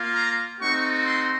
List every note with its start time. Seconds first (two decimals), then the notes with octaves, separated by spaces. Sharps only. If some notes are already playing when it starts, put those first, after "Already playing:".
Already playing: A#3 F4
0.14 A#5
0.60 A3 C4 D#4 F#4 C#6
1.05 C6